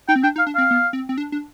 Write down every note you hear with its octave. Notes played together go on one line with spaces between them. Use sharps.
D#4 G5
C4
D4 G5
D#4
F5
D4
C4 F5
B3
C4
C4
D4
D4